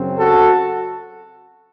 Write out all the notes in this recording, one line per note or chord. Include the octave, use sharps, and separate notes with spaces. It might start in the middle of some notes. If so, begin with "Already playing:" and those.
Already playing: F#2 C#3 F#3 C4
F#4 A4